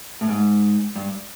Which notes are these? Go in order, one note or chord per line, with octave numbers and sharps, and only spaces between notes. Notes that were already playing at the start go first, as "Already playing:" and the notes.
A2
G#2
G2